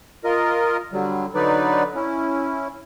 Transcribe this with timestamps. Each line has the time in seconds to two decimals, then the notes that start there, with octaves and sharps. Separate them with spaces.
0.24 F4 A#4 D#5
0.93 D3 F#3 G3
1.35 D3 F#3 D#4 B4 D5
1.95 C#4 E4